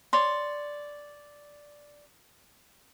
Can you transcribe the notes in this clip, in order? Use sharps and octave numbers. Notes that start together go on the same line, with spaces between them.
C#5 D5 C6